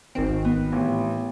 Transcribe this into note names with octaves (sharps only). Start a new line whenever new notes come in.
G#1 D#3 C4
B3
A1